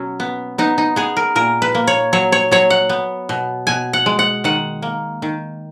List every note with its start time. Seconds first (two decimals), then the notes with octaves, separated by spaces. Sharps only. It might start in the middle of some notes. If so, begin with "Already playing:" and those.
Already playing: B2 F#3 C#4
0.20 B3
0.58 B3 D#4
0.78 D#4
0.96 B3 G#4
1.17 A#4
1.35 A#2 A#4
1.62 B4
1.75 A#3
1.87 C#5
2.13 F#3 C#5
2.32 C#5
2.51 F#3 C#5
2.70 F#5
2.89 B3
3.29 B2
3.67 B2 G#5
3.93 F#5
4.06 G#3
4.19 F#5
4.44 D#3 F#5
4.82 A#3
5.22 D#3